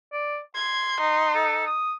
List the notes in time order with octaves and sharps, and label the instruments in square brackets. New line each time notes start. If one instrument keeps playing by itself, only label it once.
[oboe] D5
[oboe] C6 [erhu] G#6
[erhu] D#4
[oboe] A4
D#6